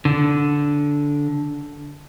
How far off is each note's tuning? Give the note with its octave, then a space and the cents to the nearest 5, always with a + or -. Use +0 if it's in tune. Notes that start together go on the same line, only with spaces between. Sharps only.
D3 -10